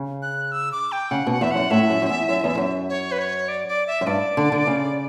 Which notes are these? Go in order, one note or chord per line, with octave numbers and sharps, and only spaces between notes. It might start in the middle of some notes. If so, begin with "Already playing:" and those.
Already playing: C#3
F#6
E6
D6
G5
C#3 F#5
B2 F#5
E2 E5
F#2 F#5
A2 E5
F#2
F#2
E2
F#2
E2
F#2
C#5
B4
C#5
D5
D5
E5
F#2
G2 D5
D3
D3
C#3